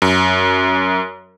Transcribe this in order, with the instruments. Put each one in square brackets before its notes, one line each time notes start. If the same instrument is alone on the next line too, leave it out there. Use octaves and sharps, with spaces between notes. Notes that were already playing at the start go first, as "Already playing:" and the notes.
[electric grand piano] F#2